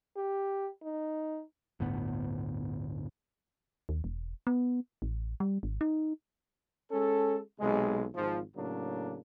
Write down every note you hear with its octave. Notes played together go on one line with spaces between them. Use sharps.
G4
D#4
G1 D2 A2 B3
D#2
E1
B3
A1
G3
G#1
D#4
G#3 C#4 A4
B1 C3 G#3
G#1 F3
A2 C#3 F#3 A#3 D4